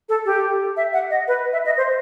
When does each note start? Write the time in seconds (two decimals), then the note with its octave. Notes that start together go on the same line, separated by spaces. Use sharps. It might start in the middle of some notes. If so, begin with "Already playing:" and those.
0.09 A4
0.26 G4
0.77 E5
0.93 F#5
1.10 D#5
1.28 B4
1.53 E5
1.66 D#5
1.77 C5